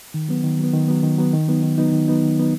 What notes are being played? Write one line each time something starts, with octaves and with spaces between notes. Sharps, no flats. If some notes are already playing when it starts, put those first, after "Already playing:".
D#3
F#3 B3
D#3
F#3 B3
D#3
F#3 B3
D#3
F#3 B3
D#3
F#3 B3 D#4
D#3
F#3 B3 D#4
D#3
F#3 B3 D#4
D#3
F#3 B3 D#4